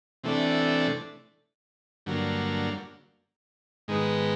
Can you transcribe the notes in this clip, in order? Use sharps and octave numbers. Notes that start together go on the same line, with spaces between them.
C3 E3 A3 D4
G2 D3 F#3 A#3
G#2 D#3 G#3 B3